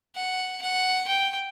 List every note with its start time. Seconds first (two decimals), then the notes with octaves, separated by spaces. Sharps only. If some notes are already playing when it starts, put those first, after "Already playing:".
0.16 F#5
0.62 F#5
1.08 G5